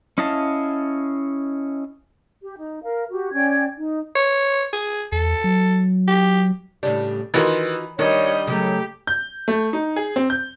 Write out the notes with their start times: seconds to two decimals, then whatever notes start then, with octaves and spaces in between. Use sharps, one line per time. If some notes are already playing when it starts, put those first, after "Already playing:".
0.18 C#4 E4 D#5 F5 A5
2.42 G4
2.57 D#4
2.83 A#4 F5
3.10 F#4 G4
3.33 C#4 D5 G5 G#6
3.78 D#4
4.16 C#5
4.73 G#4
5.12 E2 A4
5.44 F#3
6.08 G4
6.83 A2 C#3 G3 D4
7.34 D#3 E3 D#4 F4 F#4
7.99 D#3 G3 D4 C#5 D#5
8.47 C#3 F#3 A3 G4
9.07 G6
9.48 A3
9.73 D#4
9.96 G#4
10.16 C4
10.30 G6